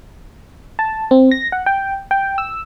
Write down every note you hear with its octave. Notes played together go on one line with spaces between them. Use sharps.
A5
C4
A#6
F#5
G5
G5
E6